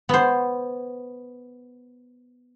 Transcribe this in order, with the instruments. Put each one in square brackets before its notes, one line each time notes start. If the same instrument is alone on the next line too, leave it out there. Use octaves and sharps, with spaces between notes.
[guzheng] B3 C5